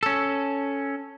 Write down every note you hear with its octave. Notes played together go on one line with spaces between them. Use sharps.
C#4 A4